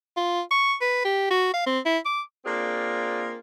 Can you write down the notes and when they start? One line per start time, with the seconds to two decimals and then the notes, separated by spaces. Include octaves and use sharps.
0.16 F4
0.51 C#6
0.81 B4
1.05 G4
1.30 F#4
1.54 F5
1.66 C4
1.86 E4
2.05 D6
2.45 A#3 C4 D4 F4 G#4